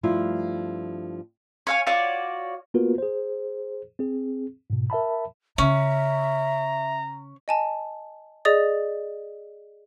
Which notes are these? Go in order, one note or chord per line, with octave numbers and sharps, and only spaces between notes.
G2 F3 A3 E4 F4
C#5 F5 G#5
F4 F#4 C#5 D5
A#3 B3 F4 F#4 A#4 B4
G#4 C5
C4 G#4
G#2 B2
A#4 E5 A5 B5
C#3 C#4 E5 A#5
D#5 G#5 A5
G#4 D5 D#5 D#6 A6